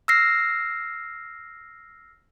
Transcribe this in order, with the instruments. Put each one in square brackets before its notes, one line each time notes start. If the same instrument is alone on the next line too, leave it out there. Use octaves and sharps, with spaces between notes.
[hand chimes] E6 F6 A#6 C7